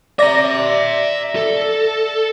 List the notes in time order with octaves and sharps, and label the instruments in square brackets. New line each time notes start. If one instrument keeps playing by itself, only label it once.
[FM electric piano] D5 A#6 [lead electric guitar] E5 A#5
[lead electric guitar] A4